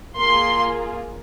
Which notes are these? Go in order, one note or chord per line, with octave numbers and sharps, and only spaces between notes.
A#3 F4 G#4 C6